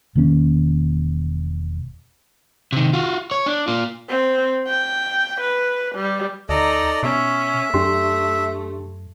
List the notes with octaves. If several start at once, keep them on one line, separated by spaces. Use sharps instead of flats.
E1 D#3 A#3 C#4
C3 D#3
F4 F#4
C#5
D4
A#3 F4
C4
G5
B4
G3
D2 D#4 A4 D5 D#5 A#5
B2 C#4 E5
F#2 A3 D4 G4 C6